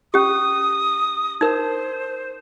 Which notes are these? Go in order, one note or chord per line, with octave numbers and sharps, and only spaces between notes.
C#4 G4 D#6
D#4 A#4 C5